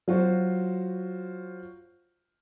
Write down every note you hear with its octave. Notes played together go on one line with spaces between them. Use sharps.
F#3 F4 F#4 C5